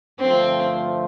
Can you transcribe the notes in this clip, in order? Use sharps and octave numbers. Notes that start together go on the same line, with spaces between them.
G2 D3 F3 A3 C4